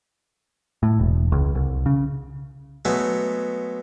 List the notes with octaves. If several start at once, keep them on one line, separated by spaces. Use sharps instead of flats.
A2
E1
C#2
C2
C#3
F#3 G#3 A3 B3